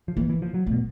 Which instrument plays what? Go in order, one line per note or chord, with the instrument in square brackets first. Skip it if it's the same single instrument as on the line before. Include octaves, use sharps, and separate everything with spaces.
[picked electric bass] F3
[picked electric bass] E3 [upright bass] A#3
[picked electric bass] E3
F3
F#3
[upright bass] A3
[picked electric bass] B2